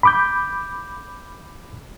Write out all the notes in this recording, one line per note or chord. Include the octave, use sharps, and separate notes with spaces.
B5 D6 G6